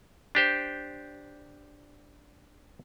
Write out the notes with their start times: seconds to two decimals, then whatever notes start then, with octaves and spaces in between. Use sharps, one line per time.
0.35 D4 G4 C5